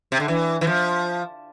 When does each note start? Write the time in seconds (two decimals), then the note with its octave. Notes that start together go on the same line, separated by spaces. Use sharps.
0.12 C3
0.20 D3
0.28 E3
0.61 E3
0.67 F3